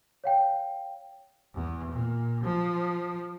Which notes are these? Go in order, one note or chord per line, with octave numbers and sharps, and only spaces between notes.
C#5 F5 G5
E2
A#2
F3